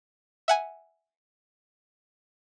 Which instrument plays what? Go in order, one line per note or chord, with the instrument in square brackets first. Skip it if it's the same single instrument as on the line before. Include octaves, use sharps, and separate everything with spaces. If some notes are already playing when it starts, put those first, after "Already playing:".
[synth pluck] E5 F#5 G#5